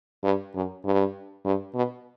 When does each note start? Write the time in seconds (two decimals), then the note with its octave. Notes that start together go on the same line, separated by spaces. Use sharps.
0.23 G2
0.55 F#2
0.85 G2
1.45 G2
1.75 B2